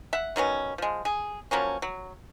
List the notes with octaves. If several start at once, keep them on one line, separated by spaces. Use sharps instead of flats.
E5 F#5
D#3 F#3 B3 C#4
F3 G#3
G#4
F3 F#3 A#3 C#4
F#3